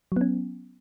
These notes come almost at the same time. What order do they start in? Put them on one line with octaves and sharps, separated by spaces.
F#3 B3 C#4